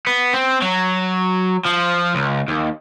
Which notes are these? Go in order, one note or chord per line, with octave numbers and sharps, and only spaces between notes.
B3
C4
F#3
F3
C#2
D#2